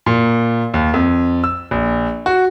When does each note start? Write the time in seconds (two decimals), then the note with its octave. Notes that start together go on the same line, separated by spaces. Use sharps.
0.06 A#2
0.74 D#2
0.94 F2
1.44 E6
1.71 A#1
2.26 F#4